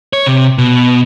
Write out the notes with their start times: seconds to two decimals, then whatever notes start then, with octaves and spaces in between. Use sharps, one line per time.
0.13 C#5
0.26 C3
0.58 B2